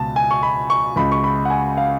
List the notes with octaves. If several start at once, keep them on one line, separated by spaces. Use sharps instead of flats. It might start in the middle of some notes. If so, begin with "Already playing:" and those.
Already playing: C#2 B2 A5
G#5
C#6
B5
C#6
C#2 C#3 B5
C#6
B5
F#5
G#5
F5